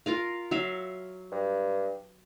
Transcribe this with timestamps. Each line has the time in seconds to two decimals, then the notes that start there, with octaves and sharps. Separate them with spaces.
0.06 F4 A#4 F5
0.51 F#3 E5 F5
1.31 G2